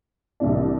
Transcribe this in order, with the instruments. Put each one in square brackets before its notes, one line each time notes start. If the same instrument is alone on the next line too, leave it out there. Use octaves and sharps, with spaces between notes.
[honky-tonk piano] C2 C3 E3 D4